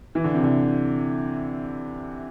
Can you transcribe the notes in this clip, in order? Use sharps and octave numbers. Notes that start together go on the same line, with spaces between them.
E3
D3
C3
D3